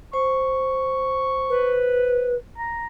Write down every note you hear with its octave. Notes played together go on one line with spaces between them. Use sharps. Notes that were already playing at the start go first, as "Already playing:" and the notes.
C5 C#6
B4
A#5